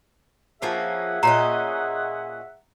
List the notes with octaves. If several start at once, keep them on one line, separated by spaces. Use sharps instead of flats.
F3 A#3 C#4 G#4 E5 F#5
A#2 C#4 D#5 A#5